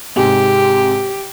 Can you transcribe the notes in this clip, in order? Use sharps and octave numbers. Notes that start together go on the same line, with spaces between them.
G#2 C3 G#3 G4